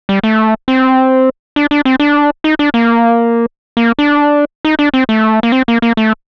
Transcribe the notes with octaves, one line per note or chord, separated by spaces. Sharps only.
G3
A3
C4
D4
D4
C4
D4
D#4
D4
A#3
A#3
D4
D#4
D4
C4
A3
A#3
C4
A#3
A#3
A3